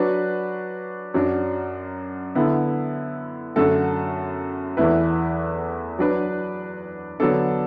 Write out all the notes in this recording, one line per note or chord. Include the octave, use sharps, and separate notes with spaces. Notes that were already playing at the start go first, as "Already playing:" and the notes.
Already playing: F#3 D4 F#4 B4
F#2 F#3 D4
D3 B3 E4
F#2 D3 A3 F#4 A4
E2 E3 A3 E4 B4
F#3 D4 B4
D3 F#3 B3 D4 A4